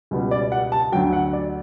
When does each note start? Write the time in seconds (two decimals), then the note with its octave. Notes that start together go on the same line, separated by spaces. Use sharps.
0.11 C#2 B2 G3
0.31 D5
0.52 F#5
0.72 A5
0.92 D2 D3 F#3 G5
1.13 F#5
1.33 D5